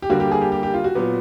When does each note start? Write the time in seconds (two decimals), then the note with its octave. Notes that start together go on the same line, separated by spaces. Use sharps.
0.02 G4
0.10 D3 G3 A#3 F#4
0.20 G4
0.32 G#4
0.42 G4
0.52 G4
0.63 G4
0.74 F4
0.84 F#4
0.95 A#2 F#3 B3